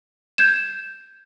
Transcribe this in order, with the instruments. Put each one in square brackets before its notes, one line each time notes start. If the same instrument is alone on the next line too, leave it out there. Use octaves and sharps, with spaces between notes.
[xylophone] G6 G#6 E7